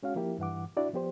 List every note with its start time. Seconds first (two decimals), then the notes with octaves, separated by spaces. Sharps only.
0.03 G#3 C#4 F#4 F5
0.16 F3 A#3 E4 G4
0.38 G2 E3 F#5 D6
0.77 D4 E4 F#4 D5
0.93 F3 B3 G4 C5